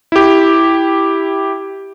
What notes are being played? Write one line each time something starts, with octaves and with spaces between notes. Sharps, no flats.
E4 G4